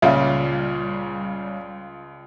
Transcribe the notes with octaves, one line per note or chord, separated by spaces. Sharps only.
C#2 A#2 C#3 G3 F4 D5 E5 F5